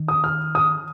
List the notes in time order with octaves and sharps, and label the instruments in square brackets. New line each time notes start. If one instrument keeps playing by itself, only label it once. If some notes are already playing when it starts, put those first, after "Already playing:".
Already playing: [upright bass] D#3
[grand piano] D#6
F6
D#6